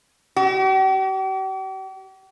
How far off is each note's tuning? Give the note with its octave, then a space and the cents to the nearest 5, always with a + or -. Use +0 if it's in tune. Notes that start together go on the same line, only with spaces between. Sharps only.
G4 -45